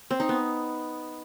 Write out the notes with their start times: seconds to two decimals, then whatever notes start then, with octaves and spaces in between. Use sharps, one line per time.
0.11 C4
0.20 D#4
0.29 B3